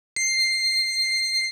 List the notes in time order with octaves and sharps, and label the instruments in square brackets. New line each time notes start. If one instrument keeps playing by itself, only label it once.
[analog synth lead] C7